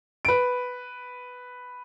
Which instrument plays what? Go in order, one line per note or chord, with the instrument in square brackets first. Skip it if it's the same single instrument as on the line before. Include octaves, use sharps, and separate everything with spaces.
[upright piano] B4 D7